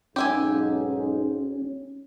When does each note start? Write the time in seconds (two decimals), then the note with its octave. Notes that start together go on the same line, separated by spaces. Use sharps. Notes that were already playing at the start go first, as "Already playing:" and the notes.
0.16 B1 G#2 C#4 G4 E5 G#5